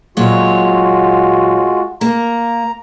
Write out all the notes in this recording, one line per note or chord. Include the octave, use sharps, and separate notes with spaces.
A#2 F#3 G#3 F4 F#4 C#5
A#3 A#5